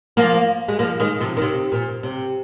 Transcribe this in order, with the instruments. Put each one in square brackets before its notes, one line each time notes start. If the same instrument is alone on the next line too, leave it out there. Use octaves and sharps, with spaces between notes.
[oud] F3 A#3
G#3
F3 A#3
D#3 G#3
C3 F3
D#3
C3
A#2
C3